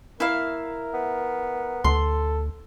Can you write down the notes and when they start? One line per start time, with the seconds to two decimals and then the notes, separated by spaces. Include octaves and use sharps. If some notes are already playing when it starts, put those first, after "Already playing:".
0.20 A#3 E4 A#4 E5 F5
0.94 B3
1.84 D2 A4 C6